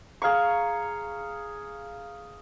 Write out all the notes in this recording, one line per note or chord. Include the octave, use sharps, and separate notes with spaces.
G#4 F5 A#5 C#6